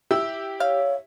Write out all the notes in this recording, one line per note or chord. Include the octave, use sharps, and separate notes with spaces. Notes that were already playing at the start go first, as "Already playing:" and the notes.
E4 G4 E6
C#5 F5